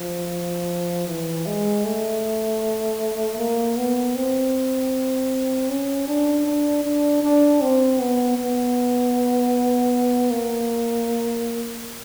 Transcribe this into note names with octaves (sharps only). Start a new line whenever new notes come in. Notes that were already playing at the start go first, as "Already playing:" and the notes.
Already playing: F3
E3
G#3
A3
A#3
B3
C4
C#4
D4
D4
D4
D4
C4
B3
B3
A#3